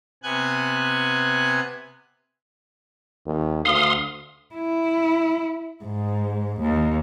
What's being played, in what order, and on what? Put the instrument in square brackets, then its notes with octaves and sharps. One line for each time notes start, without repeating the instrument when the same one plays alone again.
[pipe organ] C3 B3 G#5 F#6 G#6
[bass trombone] D#2
[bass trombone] D2 [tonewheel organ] F5 C6 D#6
[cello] E4
G#2
D#2